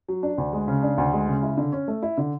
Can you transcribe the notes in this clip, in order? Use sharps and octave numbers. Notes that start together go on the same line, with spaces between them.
F#3
D4
D2
G#3
C#3
D4
D2
G#3
C#3
E4
D3
C#4
A3
E4
D3